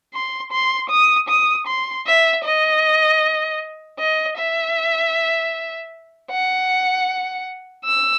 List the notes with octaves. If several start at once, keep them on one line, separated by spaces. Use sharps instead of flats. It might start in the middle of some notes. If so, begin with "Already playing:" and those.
C6
C6
D#6
D#6
C6
E5
D#5
D#5
E5
F#5
E6